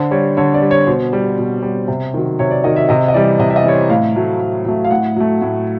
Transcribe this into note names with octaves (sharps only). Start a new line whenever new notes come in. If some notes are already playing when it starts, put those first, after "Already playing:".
Already playing: D3 C5
G3 C#5
D3 C#5
D5
G3
C#5
B2 C5
G3
B2
G3
C3
D#3 F#3
C3 C#5
D5
D#3 F#3 D#5
E5
C3 D#5
D#5
E3 G3 D5
C3 D#5
E5
D#5
E3 G3 C#5
C5
A2 F5
F#3 A3
A2
F#3 A3
F5
A2 F#5
F#3 A3
A2